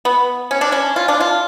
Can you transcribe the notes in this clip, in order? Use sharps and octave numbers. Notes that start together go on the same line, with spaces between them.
B3
C#4
D4
C#4
F4
D4
F4